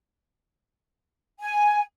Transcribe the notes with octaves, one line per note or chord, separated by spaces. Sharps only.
G#5